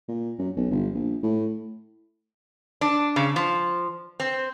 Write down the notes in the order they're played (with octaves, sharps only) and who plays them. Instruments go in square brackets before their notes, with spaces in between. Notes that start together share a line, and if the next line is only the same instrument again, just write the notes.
[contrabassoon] A#2
F#2
B1
G1
A#1
A2
[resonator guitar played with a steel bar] D4
C#3
F3
C4